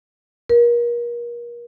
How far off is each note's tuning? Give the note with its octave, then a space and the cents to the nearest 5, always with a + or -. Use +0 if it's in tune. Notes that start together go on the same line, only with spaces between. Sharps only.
A#4 +35